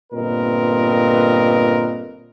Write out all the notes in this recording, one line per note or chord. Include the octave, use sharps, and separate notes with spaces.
G1 A#2 C4 A#4 B4 D#5